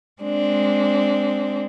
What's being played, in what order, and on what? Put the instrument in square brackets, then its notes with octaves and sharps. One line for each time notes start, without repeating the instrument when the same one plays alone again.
[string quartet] G#3 C4 D4